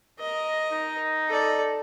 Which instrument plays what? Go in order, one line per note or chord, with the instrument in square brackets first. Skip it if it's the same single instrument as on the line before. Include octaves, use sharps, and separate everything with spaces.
[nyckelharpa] A#4 D#5
[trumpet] D#4
[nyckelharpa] A4 D5